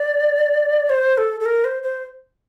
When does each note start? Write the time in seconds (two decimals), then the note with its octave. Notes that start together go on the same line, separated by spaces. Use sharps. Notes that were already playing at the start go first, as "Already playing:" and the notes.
Already playing: D5
0.90 C5
1.18 A4
1.40 A4
1.46 A#4
1.65 C5
1.83 C5